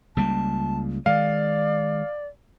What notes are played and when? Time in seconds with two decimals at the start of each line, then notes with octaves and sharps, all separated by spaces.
0.17 C#2 G3 A#3 A5
1.06 D#3 G#3 D5 F5